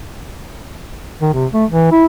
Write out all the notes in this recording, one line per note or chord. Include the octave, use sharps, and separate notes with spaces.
D#3
C3
A3
E3
E4